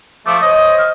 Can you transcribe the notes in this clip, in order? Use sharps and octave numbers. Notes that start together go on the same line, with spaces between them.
F3 A3 D6
C5 C#5 D#5 D#6
F6